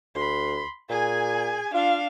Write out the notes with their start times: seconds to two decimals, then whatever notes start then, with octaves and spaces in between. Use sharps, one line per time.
0.15 D2 B5 C6
0.90 A#2 G#4 G#5
1.74 D4 F4 F5